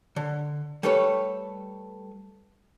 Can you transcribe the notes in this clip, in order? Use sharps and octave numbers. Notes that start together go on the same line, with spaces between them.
D3
G3 A3 A4 B4 C#5